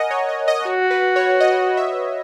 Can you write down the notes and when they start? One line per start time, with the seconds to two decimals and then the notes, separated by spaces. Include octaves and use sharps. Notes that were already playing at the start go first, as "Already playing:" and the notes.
Already playing: A#4 D#5 F#5 G#5
0.11 C#5
0.29 D#5
0.48 D#5
0.66 F#4 C#5
0.91 B4
1.16 C#5
1.40 D#5
1.77 E5